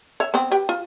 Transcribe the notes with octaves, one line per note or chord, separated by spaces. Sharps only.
C#5 E5
B3 C4
G4 B4 G5
F4